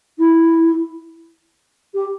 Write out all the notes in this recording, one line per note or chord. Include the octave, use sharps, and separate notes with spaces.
E4
G4